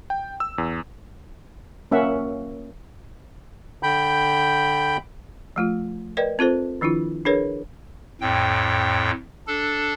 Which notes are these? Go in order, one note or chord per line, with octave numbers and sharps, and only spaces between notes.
G5
E6
E2
A#3 C#4 E5 F#5
D3 G5 B5 G6
F3 A3 F4
A#4 B4 D5 D#5 G5
C4 F4 A4 C5
D#3 F3 D4 E4 F4
D4 G#4 A#4 B4 C#5
F2 A2 G5
D4 A4